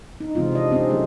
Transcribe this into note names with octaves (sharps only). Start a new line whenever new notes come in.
D#4
C3 E3 G#3 C4 F4
D4 D#5
C4 C#4 D#4
F#3 A3 C#4 G#4